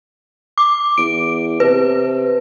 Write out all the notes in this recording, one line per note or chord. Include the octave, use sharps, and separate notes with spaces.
D6
E2 D7
C3 B4